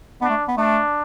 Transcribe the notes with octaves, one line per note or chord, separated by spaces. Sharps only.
B3 D4
A3
B3
A3 D4